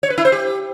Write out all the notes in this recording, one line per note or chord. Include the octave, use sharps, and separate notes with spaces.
C#5
B4
E4
C5
G4